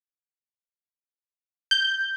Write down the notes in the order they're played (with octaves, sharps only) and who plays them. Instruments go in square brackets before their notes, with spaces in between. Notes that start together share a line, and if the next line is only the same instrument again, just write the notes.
[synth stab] G6